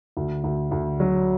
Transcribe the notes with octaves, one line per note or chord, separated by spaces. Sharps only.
D2
D2
D2
F#3